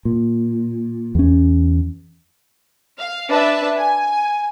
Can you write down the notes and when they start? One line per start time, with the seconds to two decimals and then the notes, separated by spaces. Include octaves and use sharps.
0.05 A#2
1.15 E2 C#4
2.98 F5
3.29 D4 B4 E5 A5
3.77 G#5